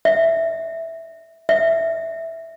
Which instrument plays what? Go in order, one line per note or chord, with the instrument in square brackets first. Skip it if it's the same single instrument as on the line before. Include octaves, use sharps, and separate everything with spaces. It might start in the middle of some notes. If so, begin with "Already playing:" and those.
[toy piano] E5
E5